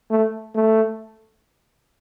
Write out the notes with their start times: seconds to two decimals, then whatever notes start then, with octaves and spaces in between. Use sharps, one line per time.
0.11 A3
0.55 A3